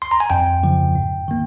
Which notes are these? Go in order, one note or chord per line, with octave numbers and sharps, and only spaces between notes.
C6
A#5
G#5
F2 G5
C#3 F3
G#2
D#3 A#3